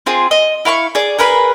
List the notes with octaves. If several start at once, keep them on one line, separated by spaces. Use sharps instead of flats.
C4 F4 G#4
D#5
E4 F5 C6 C#6
G#4 D5
G#4 A#4 B4 B5